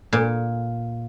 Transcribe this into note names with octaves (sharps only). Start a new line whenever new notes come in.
A#2